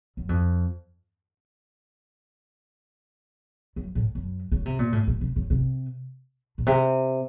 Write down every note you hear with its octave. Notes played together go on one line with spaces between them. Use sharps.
F#2
F2
F#2
A2
F#2
C#3
C3
A#2
A2
A#2
C3
C#3
C3
A#2
C3